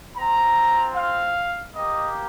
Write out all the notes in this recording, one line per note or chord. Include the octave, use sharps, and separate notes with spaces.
C4 F4 A#5
F5
A#3 G4 D#5